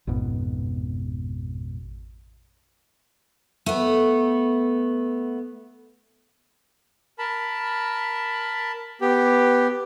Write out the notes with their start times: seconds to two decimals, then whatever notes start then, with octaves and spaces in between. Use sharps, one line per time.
0.07 A1 F2 G#2 B2
3.66 A3 B3
7.19 A#4 A5 B5
9.01 B3 G4